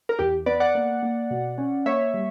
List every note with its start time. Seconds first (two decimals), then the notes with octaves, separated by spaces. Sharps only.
0.09 A#4
0.19 E2 G4
0.46 B3 B4 D5
0.60 D5 F#5
0.75 A#3
1.03 A#3
1.31 B2
1.58 C#4
1.86 A#3 C#5 E5
2.14 G3